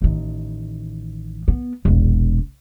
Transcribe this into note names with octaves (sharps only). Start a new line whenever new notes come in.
A1 D#3
B3
E1 A#1